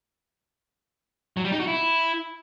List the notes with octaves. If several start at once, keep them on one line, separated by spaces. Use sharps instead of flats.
F#3
G3
D#4
F#4
E4